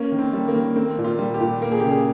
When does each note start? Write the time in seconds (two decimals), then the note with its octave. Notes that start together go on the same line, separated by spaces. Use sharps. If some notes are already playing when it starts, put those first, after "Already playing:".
Already playing: A#3 C#4
0.12 D#3
0.18 C4
0.33 G3
0.48 A#3
0.55 D#3
0.76 A#3 C4
0.98 A#2
1.04 F4
1.19 G3
1.34 G4
1.40 A#2
1.62 A#3 A#4
1.72 G#4
1.80 G4
1.84 C#3
1.89 G#4